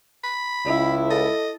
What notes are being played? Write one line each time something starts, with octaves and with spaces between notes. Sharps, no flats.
B5
C#2 E4
A4 D#5